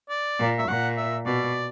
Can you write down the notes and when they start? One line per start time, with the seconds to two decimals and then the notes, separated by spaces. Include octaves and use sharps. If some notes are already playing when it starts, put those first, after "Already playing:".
0.09 D5
0.39 A#2
0.58 E5
0.68 A#2 F#5
0.97 E5
1.26 B2 D5